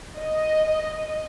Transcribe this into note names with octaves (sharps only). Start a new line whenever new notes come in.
D#5